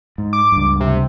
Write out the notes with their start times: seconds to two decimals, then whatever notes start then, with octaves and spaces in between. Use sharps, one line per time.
0.18 G#2
0.33 D6
0.52 C#2 G2
0.80 C3